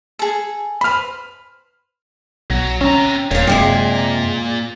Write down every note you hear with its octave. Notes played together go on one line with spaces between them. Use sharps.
G#4 A4
B4 C5 B5 F6
B1 F#3
C4 C#4 A#5
D#1 A#2 C#5 F5
F#2 C3 G#3 G#4